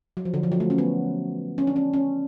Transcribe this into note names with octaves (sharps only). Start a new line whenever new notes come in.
F#3
F3
D3
F3
F#3
A3
C#4
B3
C#4
D4
C#4
C#4